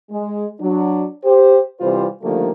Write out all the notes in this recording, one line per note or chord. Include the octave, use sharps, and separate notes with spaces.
G#3
F#3 D4
G4 C5
C3 E3 G3 F4 C5
D3 D#3 F3 G3 A3 A#3